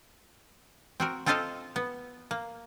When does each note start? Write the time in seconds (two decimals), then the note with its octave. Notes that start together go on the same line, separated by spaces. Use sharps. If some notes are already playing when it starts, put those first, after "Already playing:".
1.00 C4 F#4 A#4
1.26 C4 F4 A4 C5 D#5 F5
1.76 B3
2.31 A#3